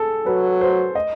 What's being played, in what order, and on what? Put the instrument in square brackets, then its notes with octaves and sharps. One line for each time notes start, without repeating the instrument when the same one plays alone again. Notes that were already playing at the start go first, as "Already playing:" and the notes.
Already playing: [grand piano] G#4 A4
[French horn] F#3 [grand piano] B4
[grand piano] C5
D#5